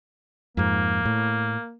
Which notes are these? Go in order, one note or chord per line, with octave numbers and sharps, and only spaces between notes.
F2 G#2 A#3
A2